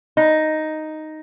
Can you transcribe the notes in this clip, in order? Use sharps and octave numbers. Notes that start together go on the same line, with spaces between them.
D#4